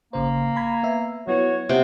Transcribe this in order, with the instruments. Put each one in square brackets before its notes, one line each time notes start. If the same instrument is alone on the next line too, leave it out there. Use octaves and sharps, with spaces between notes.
[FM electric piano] G#1 C#3 C5 [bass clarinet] A#3
[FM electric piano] A#5 B5 G#6
B3 E5
[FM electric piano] F#3 B3 E4 [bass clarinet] F#4 [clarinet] C#5
[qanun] C3 G5 [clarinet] B3